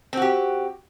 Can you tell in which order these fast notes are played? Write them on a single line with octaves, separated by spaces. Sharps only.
C4 F#4 G4